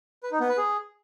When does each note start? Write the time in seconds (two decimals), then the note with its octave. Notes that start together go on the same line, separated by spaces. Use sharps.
0.23 B4
0.32 D#4
0.40 B3
0.49 B4
0.57 G#4